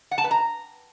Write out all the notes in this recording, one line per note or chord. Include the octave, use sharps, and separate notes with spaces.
F#5
A5
B4
A#5